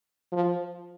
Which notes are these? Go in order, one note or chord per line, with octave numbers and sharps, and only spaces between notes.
F3